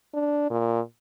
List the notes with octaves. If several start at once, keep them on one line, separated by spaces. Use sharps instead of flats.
D4
A#2